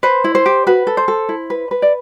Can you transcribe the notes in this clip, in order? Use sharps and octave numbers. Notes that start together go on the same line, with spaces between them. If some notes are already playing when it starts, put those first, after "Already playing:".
B4 C5
E4
C5
G4
F#4 B4
A4
C5
A4
E4
B4
B4
D5